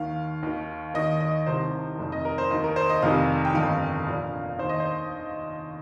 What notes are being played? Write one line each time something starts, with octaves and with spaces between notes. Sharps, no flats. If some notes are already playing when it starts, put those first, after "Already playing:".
Already playing: D#2 D#3 F5
D#2 D#3
D#2 D#3 D#5
D#5
C2 C3 D#3 C5
F1 F2 D#3
D#5
A#4
C5
D#2 D#3 D#5
A#4
C5
D#5
F1 F2 C3 D#3 F5
G5
G1 F2 D#3 F5
A#1 A#2
D#2 D#3 C5
D#5
C5